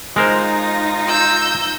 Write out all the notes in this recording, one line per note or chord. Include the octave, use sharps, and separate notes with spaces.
G#3 D#4 F4 A#4 C5 A#6
E6 G6